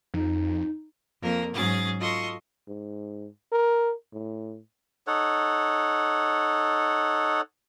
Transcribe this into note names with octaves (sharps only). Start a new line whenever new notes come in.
F2 D#4
F2 A#3 A#4
G#2 F#3 C#4 G#4 A6
F4 F#4 A4 D#5 C6 C#6
G#2
A#4
A2
D#4 A4 C#5 F#5